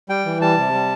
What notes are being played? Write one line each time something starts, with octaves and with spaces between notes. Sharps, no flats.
G3 G5
E3
G3 A5
C3
G3